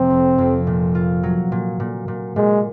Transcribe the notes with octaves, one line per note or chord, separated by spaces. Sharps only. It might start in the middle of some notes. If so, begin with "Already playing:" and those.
Already playing: F1 C3 C4
F2
F2
A#2
F4
F#3
A#2
A#2
A#2
A#2 G#3